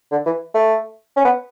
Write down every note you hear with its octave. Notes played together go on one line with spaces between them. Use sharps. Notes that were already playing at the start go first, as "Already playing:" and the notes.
D3
E3
A3
C#4
B3